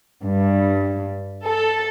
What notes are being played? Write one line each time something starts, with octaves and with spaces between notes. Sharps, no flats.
G2
A4